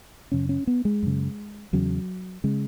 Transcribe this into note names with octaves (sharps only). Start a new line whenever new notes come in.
F#2 C#3 C#4
C#4
B3
G#3
F#2 C#3
E2 C#3 F#3
C#3 G#3